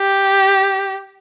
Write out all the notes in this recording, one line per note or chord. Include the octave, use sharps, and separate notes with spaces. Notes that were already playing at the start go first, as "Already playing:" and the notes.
Already playing: G4